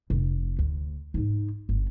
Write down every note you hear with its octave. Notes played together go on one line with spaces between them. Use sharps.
F1
D2
G#2 D#4
G1